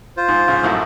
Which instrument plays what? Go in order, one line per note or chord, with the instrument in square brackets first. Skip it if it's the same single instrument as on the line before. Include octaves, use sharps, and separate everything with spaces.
[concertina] F4 C5
[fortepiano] G#2
G#2 C#3
C2 F#2 A2